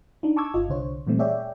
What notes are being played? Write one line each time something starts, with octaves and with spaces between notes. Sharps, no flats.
D4 D#4
A5 C#6 D6 E6 G#6
G1 F4 D#5
C2 D3 C5 C#5
A#2 E3 G3 A3 C4
G#4 C#5 D5 E5 G5